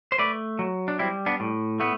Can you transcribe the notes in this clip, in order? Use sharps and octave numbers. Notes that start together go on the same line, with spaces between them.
C5
A3 B4 D5
F#3
D4
G3 C4 E4
B3 D4
A2
A3 B3